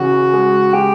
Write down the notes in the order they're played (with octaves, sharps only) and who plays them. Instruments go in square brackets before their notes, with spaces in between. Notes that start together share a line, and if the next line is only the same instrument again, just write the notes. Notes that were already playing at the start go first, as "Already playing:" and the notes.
Already playing: [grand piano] C#3 E3 [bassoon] F#4
[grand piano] G#3
[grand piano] G#3 [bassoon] G4